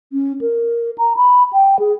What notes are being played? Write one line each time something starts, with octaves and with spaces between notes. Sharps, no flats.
C#4
A#4
A#5
B5
G5
G#4